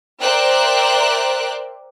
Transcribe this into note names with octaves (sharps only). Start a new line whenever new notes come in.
A#4 C5 D5 E5 G5 F#6